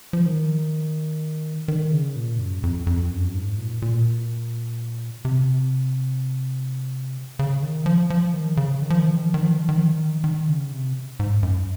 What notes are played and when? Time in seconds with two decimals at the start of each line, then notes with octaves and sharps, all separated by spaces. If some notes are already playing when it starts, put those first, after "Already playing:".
0.13 F3
0.26 D#3
1.68 D#3
1.92 C#3
2.16 A#2
2.39 F#2
2.63 F2
2.87 F2
3.11 F#2
3.34 G#2
3.58 A#2
3.82 A#2
5.25 C3
7.39 C#3
7.62 D#3
7.86 F3
8.10 F3
8.33 D#3
8.57 C#3
8.82 D#3
8.90 F3
8.99 D#3
9.07 F3
9.17 D#3
9.25 F3
9.34 D#3
9.43 F3
9.52 D#3
9.59 F3
9.69 D#3
9.77 F3
9.86 D#3
10.24 D#3
10.48 C#3
10.72 C3
11.20 G#2
11.43 F#2